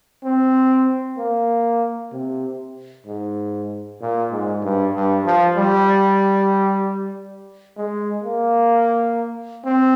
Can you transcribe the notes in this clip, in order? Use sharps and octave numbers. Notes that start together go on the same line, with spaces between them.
C4
A#3
C3
G#2
A#2
G#2
G2
G2
F3
G3
G#3
A#3
C4